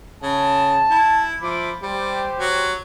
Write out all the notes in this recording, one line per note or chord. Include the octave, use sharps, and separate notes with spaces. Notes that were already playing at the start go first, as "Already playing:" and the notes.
C#3 A5
E4
F3 E5 B5 D6
G3 G4 C5
F#3